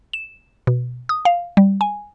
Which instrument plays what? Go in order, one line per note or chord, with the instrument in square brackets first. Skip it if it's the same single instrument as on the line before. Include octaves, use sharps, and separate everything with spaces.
[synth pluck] E7
B2
D#6
F5
G3
G#5